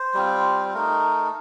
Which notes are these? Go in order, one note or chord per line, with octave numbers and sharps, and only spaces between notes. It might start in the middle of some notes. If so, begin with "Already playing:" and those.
Already playing: C5
G3 C4 F4
A3 D#4 A#4